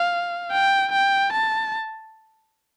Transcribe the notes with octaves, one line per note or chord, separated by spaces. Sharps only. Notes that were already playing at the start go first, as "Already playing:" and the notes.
Already playing: F5
G5
G5
A5